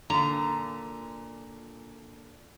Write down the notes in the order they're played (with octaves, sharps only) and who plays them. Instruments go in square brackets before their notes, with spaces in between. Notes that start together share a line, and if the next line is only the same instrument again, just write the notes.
[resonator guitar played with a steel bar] A#2 D3 [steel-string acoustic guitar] A#5